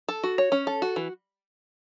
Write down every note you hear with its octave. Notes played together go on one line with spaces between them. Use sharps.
A4
F#4
C#5
C#4
A4
F#4
E3